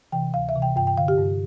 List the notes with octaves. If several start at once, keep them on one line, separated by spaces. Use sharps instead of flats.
C3 E3 G5
D2 F5
E5
C3 E3
G5
G2 G5
G5
D3 F5
G4
G2